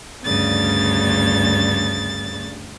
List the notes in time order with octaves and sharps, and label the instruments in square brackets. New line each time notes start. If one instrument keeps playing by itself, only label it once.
[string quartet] D2 G2 C#3 A6